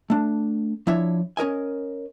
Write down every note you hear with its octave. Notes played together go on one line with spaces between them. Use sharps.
A3 D4
F3 D4 E4 C#5 E5
C#4 A#4 D#5 G#5